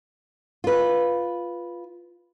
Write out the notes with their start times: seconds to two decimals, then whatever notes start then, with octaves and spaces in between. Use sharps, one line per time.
0.64 F4 B4